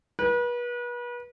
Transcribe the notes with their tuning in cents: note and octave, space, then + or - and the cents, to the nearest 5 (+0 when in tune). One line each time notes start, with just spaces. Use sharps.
B4 -35